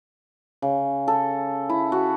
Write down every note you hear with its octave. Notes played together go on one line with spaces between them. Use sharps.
C#3
A4
E4
F#4